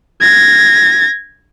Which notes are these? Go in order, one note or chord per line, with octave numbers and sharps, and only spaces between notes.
G#6 A#6